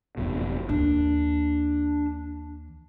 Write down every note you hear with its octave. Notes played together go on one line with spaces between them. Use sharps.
F#1 F2 B2
D#2 D4